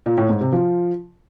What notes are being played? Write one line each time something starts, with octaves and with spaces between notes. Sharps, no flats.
A#2
A2
G#2
C3
F3